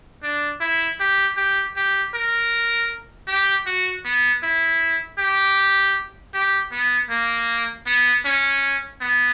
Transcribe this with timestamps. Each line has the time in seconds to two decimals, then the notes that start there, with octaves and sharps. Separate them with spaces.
0.23 D4
0.61 E4
1.00 G4
1.37 G4
1.76 G4
2.14 A#4
3.28 G4
3.66 F#4
4.05 B3
4.43 E4
5.19 G4
6.34 G4
6.72 B3
7.10 A#3
7.87 B3
8.25 C#4
9.01 B3